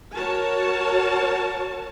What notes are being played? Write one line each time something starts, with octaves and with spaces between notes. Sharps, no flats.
F#4 A#4 C#5 A5